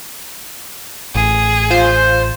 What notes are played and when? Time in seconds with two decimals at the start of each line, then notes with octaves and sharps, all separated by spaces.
1.15 A1 G#4
1.71 F4 C5